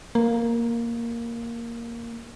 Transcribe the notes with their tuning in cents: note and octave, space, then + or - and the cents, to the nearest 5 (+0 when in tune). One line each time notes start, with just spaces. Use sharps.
A#3 +0